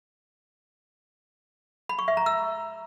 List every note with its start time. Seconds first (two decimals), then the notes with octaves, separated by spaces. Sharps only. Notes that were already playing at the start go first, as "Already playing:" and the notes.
1.89 B5
1.99 C#6
2.08 E5
2.17 A#5
2.26 E6